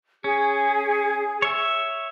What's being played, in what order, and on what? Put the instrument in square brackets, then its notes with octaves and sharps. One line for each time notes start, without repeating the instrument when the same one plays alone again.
[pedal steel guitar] C#4 [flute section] G#4
[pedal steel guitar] C#5 E5